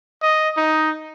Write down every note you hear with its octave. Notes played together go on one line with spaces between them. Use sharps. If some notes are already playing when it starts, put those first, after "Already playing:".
D#5
D#4